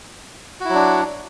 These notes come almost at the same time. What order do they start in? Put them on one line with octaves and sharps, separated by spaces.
F#4 E4 F#3 D4